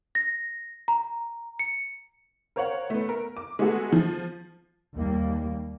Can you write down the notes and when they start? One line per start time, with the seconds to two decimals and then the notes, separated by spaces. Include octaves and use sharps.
0.15 A#6
0.88 A#5
1.59 C#7
2.56 A#4 C5 C#5 F5 F#5
2.90 A3 B3
3.09 A#4
3.37 D6
3.59 G#3 A3 B3 F#4 G#4 A4
3.92 F3
4.96 D#2 G3 A#3